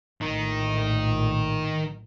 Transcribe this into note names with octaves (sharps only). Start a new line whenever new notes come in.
A#1 A2 D#3 D#4